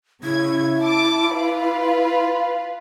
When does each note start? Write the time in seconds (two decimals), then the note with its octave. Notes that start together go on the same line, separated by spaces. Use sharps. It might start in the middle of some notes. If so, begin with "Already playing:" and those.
0.23 C#3 E4 G#6
0.81 A5 D6
1.34 F4 B4